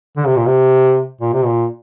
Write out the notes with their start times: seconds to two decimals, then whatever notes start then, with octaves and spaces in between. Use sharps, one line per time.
0.17 D3
0.27 C3
0.36 A#2
0.46 C3
1.21 A#2
1.33 C3
1.45 A#2